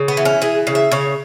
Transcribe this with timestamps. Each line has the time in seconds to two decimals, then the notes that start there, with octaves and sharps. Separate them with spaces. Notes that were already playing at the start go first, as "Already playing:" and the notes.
Already playing: C#3
0.08 B3
0.17 E3
0.25 C#4
0.42 E3 G#4
0.67 C#3
0.75 E5
0.92 C#3 C#5